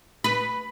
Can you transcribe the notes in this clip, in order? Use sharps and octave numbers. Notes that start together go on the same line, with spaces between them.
B4